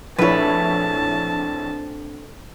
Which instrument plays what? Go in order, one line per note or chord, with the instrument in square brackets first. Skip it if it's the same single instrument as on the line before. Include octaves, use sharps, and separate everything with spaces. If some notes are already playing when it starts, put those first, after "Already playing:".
[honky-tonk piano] A#1 E4 C#5 [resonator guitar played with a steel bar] A3 B4 [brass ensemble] C4 D4 [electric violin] A5